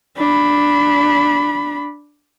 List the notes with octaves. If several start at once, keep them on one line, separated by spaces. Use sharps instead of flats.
D4 B5